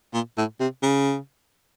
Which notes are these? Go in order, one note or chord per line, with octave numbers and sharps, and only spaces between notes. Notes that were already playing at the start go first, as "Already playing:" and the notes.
A#2
A2
C3
C#3